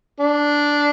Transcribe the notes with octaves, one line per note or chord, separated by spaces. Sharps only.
D4